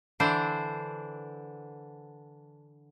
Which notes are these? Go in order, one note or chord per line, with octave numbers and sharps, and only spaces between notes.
D3 E3 D4 C5